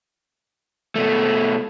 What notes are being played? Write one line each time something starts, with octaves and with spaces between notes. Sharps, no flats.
B2 A3